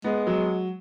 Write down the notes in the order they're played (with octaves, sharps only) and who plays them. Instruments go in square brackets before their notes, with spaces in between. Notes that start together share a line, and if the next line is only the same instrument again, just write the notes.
[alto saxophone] G#3 [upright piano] B3
[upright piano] F#3